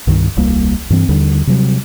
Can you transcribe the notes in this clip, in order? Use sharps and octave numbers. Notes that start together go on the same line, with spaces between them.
C2 G2 D#3
D#1 C2 G3 A#3
G2 E3 C4
D#2 D3 G3
C3 F#3 G3